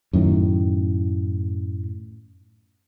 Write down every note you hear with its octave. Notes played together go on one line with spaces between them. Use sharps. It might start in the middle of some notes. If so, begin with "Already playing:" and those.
F#2 A2 D#3